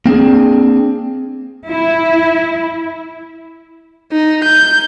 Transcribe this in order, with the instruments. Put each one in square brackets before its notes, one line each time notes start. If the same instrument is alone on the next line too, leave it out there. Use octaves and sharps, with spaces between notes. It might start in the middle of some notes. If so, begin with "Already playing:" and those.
[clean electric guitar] A#3 C4 D4 G#4
[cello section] E4
[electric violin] D#4
G6